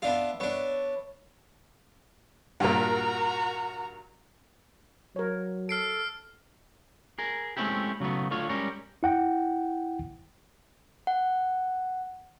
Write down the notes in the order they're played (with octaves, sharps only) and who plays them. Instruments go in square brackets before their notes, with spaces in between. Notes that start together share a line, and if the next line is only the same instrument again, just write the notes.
[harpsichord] B3 D4 F4 [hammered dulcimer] E5
[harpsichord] B3 D4 [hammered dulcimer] C#5 E5 B5
[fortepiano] G2 A#2 [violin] F#4 A#5 [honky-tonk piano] A#4 F#5
[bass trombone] F#3 [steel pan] A#4 C#5
[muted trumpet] A4 [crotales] F6 C7 D7
[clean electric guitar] G#4 A#4
G#3 A3 C4 C#4 E4 G4
C#3 F#3 A3 B3
D3 A3 F4 C#5
G3 G#3 C#4 A#4 C#5
[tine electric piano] E4 F#5 G5
[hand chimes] F#5